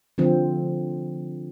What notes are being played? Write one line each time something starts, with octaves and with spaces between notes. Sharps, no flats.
D3 F3 C4